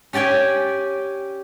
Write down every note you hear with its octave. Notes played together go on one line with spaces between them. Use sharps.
C#4 G4 D5 G5 G#5